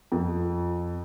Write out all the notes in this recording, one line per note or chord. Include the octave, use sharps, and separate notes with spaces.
F2